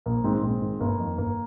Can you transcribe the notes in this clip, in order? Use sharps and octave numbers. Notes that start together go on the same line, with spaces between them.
A#1 A#3
G#2 D#3 G#3 C4
A#1 G#3 C4
G#2 D#3
G1 A#3
F2 D#3
G1 A#3